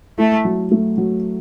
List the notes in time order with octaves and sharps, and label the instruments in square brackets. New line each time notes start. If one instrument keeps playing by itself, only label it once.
[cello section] A3 [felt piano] E4
[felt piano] F#3
A3
F#3